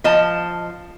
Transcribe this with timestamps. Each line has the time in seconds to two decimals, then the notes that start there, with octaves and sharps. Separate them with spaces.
0.04 F3 D#5 A5